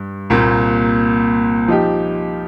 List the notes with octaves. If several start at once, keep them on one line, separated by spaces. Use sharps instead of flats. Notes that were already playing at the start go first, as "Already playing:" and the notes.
Already playing: G2
C2 A#2 A#3
F3 D#4 G4